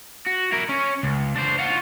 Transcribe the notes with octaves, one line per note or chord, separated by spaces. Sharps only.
F#4
E4 A#4
C#4
C#2
D4 C5
F4 F#4